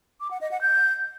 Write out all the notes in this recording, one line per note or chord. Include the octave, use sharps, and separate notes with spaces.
D6
F#5
D#5
F#5
G6